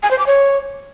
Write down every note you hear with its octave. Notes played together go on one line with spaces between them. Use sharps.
G#5
C5
D6
C#5